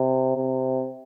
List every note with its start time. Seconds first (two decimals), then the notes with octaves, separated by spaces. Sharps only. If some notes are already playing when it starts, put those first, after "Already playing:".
Already playing: C3
0.37 C3